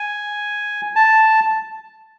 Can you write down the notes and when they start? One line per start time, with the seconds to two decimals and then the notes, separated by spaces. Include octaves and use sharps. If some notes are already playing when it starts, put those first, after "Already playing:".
Already playing: G#5
0.96 A5